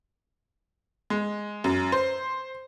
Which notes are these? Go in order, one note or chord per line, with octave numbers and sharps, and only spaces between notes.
G#3
F#2
C5